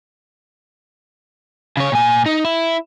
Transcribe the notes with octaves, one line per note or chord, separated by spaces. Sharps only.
C#3 C#5
A#2 G#5
D#4
E4